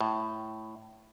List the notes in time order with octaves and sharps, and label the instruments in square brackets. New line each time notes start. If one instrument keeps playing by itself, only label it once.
[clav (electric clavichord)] A2